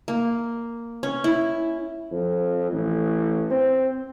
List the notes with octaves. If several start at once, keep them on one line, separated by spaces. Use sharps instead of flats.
A#3
C#4
E4
F2
A1
C4